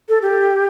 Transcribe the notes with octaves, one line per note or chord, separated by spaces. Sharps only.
A4
G4